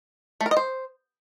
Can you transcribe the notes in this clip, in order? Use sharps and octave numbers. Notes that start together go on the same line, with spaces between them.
A3
A#4
D#5
C5